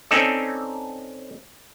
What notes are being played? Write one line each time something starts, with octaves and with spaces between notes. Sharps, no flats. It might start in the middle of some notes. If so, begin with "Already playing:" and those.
C4 C#4 D#4 A4 D5